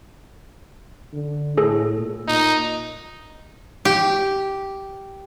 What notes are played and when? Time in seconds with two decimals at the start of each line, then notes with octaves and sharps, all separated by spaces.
1.13 D3
1.57 A2 G#4 A4
1.98 A#2
2.28 A#2 D#4
3.85 G4